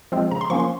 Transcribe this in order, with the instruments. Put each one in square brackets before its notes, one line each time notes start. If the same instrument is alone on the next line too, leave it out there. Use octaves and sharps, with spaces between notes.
[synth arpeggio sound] F3 G#3 C4
C#3 A#5
C6
F3 A#3 C#4 C#6
C6